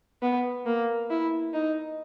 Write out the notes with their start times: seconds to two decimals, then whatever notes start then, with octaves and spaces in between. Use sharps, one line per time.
0.22 B3
0.66 A#3
1.10 E4
1.53 D#4